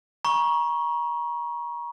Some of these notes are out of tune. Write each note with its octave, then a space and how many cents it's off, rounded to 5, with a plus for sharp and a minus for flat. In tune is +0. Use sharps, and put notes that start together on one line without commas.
A#5 +35 C#6 +0